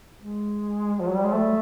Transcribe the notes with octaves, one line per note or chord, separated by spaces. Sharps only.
G#3
F3
F#3
G3
G#3
A3